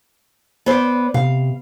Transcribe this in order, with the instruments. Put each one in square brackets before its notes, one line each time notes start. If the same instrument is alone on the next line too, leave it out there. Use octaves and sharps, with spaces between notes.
[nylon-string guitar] B3 C5 D5
[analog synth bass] C3 [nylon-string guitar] F5